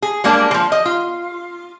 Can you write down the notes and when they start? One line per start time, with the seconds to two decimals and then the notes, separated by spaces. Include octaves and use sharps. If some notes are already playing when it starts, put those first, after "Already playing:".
0.02 G#4
0.24 G3 G#3 A#3 D4
0.51 E3 F3
0.72 D#5
0.85 F4